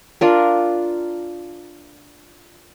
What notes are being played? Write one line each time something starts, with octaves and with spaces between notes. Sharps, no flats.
D4 F4 A#4